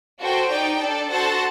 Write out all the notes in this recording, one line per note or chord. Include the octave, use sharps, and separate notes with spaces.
F#4 A4 C5 G5
D#4 G4 D5 G5
D4 A4 D5
F#4 A4 C5 F#5 A5